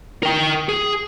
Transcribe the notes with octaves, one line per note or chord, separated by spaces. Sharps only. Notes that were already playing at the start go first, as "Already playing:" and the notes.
A#4 G5
G#4